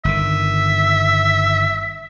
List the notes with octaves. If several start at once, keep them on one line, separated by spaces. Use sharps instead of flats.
G1 D#3 E5